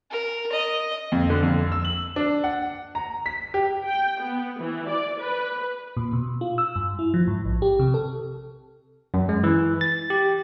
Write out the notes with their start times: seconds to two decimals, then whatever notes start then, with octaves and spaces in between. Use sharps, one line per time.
0.11 A#4
0.52 D#5
1.12 F2
1.30 D3
1.43 F2
1.72 E6
1.85 F#7
2.16 D4
2.44 F#5
2.95 A#5
3.26 B6
3.54 G4
3.85 G5
4.21 B3
4.60 E3
4.88 D5
5.21 B4
5.97 A#2
6.13 B2
6.41 F4
6.58 E6
6.76 G2
6.99 E4
7.14 F3
7.27 G#2
7.45 A#1
7.62 G4
7.79 C3
7.94 A4
9.14 F#2
9.29 G#3
9.44 E3
9.81 A6
10.10 G4